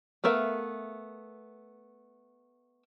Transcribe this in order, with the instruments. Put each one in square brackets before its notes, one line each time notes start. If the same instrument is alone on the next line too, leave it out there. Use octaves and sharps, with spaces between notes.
[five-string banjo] A3 B3 A#4 E5 F5